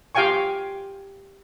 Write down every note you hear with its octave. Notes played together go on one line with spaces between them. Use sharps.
F4 G4 F5 G5 G#5 C#6